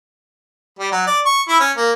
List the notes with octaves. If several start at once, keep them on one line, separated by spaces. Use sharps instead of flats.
G3
F#3
D5
C#6
E4
C#4
A#3